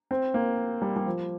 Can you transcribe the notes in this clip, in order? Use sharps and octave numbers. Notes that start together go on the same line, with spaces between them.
C4
A#3
G3
G3
F3